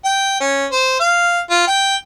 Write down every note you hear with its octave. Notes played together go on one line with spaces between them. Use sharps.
G5
C#4
C5
F5
F4
G5